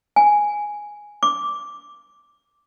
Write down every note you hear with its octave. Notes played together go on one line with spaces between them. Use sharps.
G#5
D6